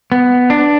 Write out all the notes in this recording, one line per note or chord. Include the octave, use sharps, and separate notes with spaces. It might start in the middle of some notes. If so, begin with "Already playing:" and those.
B3
D4